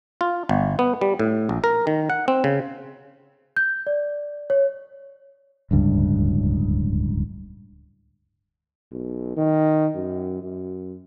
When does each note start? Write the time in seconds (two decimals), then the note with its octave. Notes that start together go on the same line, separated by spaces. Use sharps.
0.21 F4
0.49 G1
0.79 B3
1.01 G3
1.19 A2
1.49 A#1
1.64 A#4
1.87 D#3
2.10 F#5
2.28 C4
2.44 C#3
3.57 G6
3.87 D5
4.50 C#5
5.71 D1 C#2 G2
8.92 B1
9.37 D#3
9.95 F#2
10.43 F#2